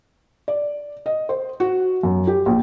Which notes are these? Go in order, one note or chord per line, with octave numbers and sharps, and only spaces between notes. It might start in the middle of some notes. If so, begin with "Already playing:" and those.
D5
D#5
C5
F#4
F#2
G4
A#1